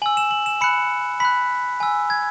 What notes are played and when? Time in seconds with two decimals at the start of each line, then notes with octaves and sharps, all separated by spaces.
0.02 G#5 F#7
0.06 E6
0.17 E7
0.31 F#7
0.46 E7
0.61 B5 F#6 C#7
1.20 B5 F#6 B6
1.80 G#5 E6
2.10 G#6